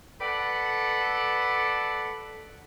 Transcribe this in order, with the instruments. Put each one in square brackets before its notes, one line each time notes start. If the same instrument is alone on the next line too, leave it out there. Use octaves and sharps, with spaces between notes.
[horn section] A4 B4 D5 F#5